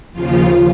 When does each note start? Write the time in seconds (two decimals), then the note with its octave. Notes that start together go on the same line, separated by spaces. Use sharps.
0.13 D#2 C#3 F3 F4